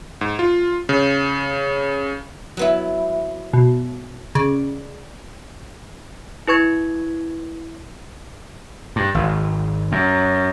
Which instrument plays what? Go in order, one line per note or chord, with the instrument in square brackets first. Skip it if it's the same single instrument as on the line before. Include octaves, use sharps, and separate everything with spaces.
[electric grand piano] G#2
F4
C#3
[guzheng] F#3 B3 E4
[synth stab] B2
[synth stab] C#3 [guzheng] D5
[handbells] E4 B4 C#6 G#6
[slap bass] G2
G#1
F#2